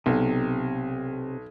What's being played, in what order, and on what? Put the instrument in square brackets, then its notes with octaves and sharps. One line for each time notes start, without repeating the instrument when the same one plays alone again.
[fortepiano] B1 [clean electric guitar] C3